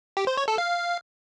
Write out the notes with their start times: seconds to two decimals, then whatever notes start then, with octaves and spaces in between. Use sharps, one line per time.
0.17 G4
0.27 C5
0.37 C#5
0.48 A4
0.58 F5